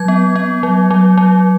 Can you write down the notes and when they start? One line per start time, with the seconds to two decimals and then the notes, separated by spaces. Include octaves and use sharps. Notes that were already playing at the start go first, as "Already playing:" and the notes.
Already playing: F#3 G#6
0.08 B3
0.36 B3
0.63 F#3
0.90 F#3
1.17 F#3